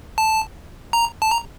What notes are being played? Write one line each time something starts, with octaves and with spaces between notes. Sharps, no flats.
A5
A#5
A5
A#5